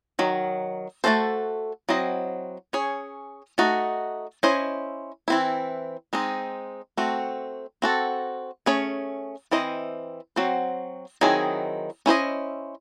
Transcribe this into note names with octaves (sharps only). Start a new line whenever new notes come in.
D#3 F#3
A3 C#4 F#4 A4 C5
F#3 C4 E4 C5 D#5
C#4 G#4 C#5
A3 D#4 F#4
C#4 E4 C5 D#5
E3 C4 E4
G#3 C4 D#4
A3 C4 F#4
C4 F#4 A4
A3 C#4 G#4 C#5
E3 C4 E4 C5 D#5
F#3 C4 F#4 C5
D#3 F#3 C4 E4 G#4
C#4 E4 C5 D#5